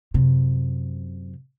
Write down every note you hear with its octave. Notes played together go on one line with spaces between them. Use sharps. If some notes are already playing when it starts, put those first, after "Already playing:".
F#2 C3